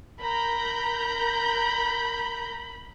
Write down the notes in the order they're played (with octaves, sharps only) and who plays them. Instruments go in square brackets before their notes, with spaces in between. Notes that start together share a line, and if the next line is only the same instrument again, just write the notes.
[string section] A#4 A#5 G6 [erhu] B5